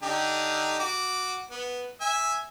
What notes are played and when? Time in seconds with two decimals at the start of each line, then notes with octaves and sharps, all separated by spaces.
0.02 D3 D#4 G4
0.80 F#4 D6
1.51 B3
2.01 E5 G#5